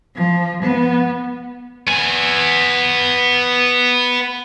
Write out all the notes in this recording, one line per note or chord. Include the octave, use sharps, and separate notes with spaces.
F3
B3
B3 G#5